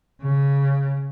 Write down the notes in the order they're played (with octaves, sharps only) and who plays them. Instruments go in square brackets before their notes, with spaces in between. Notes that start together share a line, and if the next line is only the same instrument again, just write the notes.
[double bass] C#3